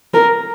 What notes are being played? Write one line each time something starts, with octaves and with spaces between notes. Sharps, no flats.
A#4